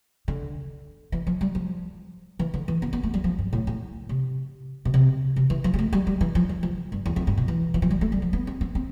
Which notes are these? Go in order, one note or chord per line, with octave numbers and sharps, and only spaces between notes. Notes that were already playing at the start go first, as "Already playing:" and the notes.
D3
E3
F3
G3
F3
E3
D3
E3
B3
B3
A3
G3
F3
G2
A2
A2
C3
B2
C3
C3
E3
F3
G3
A3
G3
G3
E3
F3
F3
F3
G2
E2
F2
G2
B2
E3
E3
F3
G3
A3
G3
F3
B3
C4
C4
C4